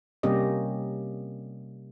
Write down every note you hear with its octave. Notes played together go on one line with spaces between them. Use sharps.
C3 G3 A#3 C#4 G4 D#5